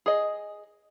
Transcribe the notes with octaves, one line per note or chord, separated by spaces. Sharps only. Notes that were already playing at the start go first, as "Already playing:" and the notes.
G#4 D#5